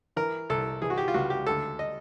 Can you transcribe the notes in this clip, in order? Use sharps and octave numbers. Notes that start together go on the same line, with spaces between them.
E3 A#4
C2 A4
E3 G#4
F#4
G4
F4
C#2 F#4
G4
D2 A4
D#5